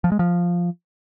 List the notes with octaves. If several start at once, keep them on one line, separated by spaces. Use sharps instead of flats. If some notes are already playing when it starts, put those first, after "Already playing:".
F3
G#3
F3